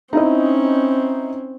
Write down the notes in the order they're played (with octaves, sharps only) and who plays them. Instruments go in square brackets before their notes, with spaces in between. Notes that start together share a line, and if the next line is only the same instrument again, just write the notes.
[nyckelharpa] C4 C#4 [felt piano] D#4 E4 D#5